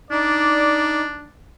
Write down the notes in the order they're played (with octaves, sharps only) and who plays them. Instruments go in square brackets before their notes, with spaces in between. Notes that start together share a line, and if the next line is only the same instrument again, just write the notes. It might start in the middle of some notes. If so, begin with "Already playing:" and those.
[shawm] D4 [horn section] D#4 D5